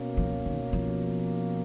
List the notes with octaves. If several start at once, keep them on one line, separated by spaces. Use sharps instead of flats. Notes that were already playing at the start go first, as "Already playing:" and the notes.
Already playing: B2 A#3 C#4
F3
D#3
F3